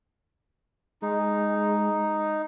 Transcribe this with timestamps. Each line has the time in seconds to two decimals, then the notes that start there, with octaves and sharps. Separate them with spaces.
1.02 G#3 D#4